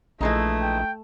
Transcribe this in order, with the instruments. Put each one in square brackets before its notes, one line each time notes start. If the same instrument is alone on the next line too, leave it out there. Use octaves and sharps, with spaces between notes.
[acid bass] A#1 [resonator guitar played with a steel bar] E3 G#3 D#4 [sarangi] A3
[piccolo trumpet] G5